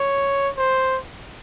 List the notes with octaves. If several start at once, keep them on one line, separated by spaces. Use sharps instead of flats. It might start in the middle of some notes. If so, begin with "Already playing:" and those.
Already playing: C#5
C5